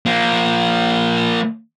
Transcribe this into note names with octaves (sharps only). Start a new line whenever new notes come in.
F3 A#3